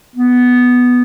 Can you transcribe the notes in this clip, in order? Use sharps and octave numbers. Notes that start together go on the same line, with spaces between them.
B3